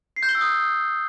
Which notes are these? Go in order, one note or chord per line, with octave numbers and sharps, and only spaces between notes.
C7
G6
G7
E6
D#6